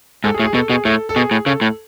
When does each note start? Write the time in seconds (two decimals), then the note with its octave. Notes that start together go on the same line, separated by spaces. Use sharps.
0.24 G#2 A4
0.34 G#4
0.39 A2
0.44 G#4
0.54 B2 A4
0.70 B2 G#4
0.85 A2 A4
1.09 A4
1.16 B2 G#4
1.31 A2
1.46 C#3 A4
1.61 A2